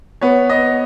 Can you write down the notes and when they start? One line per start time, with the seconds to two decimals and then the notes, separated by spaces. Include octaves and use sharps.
0.21 B3 C#5
0.49 B3 D#5